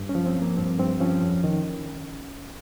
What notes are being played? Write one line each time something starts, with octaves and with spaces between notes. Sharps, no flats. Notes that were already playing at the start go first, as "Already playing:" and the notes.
Already playing: G2
C#4
F3
C4
F3
A#3
G2 C4
G2 C4
F3 C#4
F2
D#3